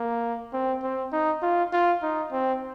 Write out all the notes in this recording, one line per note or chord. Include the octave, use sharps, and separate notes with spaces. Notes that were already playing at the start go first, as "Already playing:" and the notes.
Already playing: A#3
C4
C4
D#4
F4
F4
D#4
C4